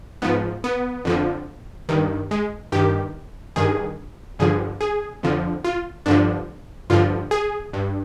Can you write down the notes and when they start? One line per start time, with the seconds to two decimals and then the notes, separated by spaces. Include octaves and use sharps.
0.22 G#2 F3 B3
0.64 B3
1.05 F2 D3 F3
1.89 G2 D#3
2.31 G#3
2.72 G2 D#3 G4
3.56 G2 D#3 G#4
4.39 G2 D3 F3 G#4
4.81 G#4
5.23 F2 D3 F3
5.64 F4
6.06 G2 D3 F3 D4
6.90 G2 D3 F3 F4
7.31 G#4
7.73 G2